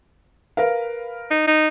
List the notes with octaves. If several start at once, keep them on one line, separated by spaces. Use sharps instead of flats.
A#4 B4 F5
D#4
D#4